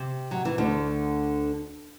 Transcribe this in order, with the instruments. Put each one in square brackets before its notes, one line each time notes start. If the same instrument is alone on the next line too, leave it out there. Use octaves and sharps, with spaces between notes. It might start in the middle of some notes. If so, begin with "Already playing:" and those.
Already playing: [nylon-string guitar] C3
F#3
E3
D2 D3